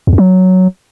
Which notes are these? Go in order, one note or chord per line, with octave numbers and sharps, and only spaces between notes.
E2
F2
F#3